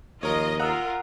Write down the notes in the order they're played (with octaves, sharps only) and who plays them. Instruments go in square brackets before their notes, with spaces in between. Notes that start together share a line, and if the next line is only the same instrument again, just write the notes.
[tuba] D#2 [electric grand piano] F3 A#4 C#5 [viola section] F4 D#5
[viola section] F4 A#4 [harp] F#5 [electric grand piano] A#5 D#6 E6